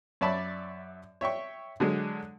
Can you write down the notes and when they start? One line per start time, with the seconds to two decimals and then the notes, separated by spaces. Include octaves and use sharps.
0.21 F#2 C#5 D5 E5 A5 B5
1.21 C#5 E5 G5 C#6
1.80 D3 F#3 G#3